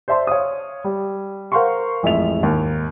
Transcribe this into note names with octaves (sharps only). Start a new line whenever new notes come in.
C5 D5 E5 A5 C6
C#5 F5 D#6
G3
A#4 C5 F5 F#5 C6 C#6
A1 F2 G#3 E5 F7
D#2 G#2